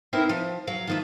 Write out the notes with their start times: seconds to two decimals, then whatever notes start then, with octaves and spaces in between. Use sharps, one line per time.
0.13 C4 D#4 E4 G4 A#4 B4
0.29 F3
0.67 F#3 F5
0.87 D#3 F3 A3